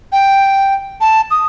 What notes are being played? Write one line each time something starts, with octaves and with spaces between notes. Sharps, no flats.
G5
A5
D#6